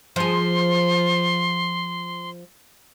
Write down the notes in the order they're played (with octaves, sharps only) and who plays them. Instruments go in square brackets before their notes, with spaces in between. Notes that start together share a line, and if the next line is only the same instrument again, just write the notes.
[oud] F3 G#4 [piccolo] C6